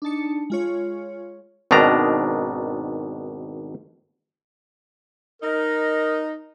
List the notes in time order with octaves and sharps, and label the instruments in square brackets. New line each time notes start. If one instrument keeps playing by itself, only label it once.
[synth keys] D4 D#4 A5 C#7
G#3 F4 C#5
[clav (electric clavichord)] G#1 B2 D#3 D4 A#5
[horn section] D#4 [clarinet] A#4